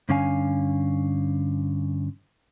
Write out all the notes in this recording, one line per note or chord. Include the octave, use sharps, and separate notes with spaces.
G2 D3 C#4 F5 G#5